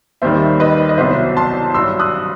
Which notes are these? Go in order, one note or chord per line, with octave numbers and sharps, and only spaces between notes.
D#2 D#3 G3 C5 E5
B4 D#5
D#5
C2 B2 F#3 C5 E5
A5 C6
G2 F#3 C6 E6
D#6 F#6